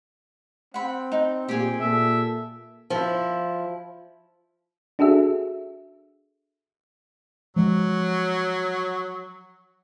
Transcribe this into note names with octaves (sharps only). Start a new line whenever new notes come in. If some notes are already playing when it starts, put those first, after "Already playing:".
C4 F#5 B5
D#4
A#2 G4 G#4
A#2 A4 E5
F3 E4
D4 F#4 G#4 A4 E5
F3 F#3 G#3